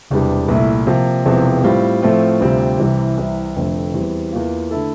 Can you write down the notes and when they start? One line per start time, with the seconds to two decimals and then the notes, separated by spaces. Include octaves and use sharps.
0.10 E1 E2 C3 G3 D4
0.48 C2 A#2 A3 E4
0.87 C3 F3 A#3
1.25 E1 E2 C3 F3 C4
1.64 A2 G3 C4 F4
2.02 A2 F3 A3 C4 F4
2.40 D2 C3 G3 C4 F4
2.79 C2 C3 E3 G3
3.18 C2 C3 E3
3.56 F1 F2 D3 A3 C4
3.94 E2 E3 G3 C4
4.32 E2 E3 A#3 F4
4.71 D3 A3 E4 A4